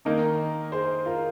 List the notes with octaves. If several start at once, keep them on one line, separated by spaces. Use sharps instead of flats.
D#3 A#3 D#4 A#4 D#5
G#4 C5
F4 A#4